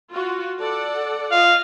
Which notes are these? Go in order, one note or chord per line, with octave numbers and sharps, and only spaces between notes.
F4 F#4
A4 D5 F#5
F4 D#5 F5